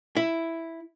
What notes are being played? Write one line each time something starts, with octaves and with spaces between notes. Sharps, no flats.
E4